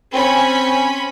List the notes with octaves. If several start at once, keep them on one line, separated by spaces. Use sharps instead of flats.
C4 C#4 B5